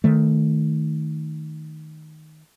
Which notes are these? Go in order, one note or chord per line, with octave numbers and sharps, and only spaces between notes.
D#3 A3